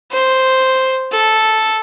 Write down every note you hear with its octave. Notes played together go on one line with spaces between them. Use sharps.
C5
A4